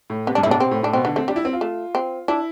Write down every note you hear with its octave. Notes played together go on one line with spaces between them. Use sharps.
A2
C3 B3
G2 D4
A2 E4
B2 D4
C3 C4
A2
A2 D4
B2 C4
D3 B3
A3 C4
G3 D4
E4
C4
F4
A3
C4
D4 E4